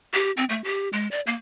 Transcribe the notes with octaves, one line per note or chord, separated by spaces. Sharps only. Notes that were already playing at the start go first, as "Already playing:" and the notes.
G4
C4
A3
G4
G#3
D5
A#3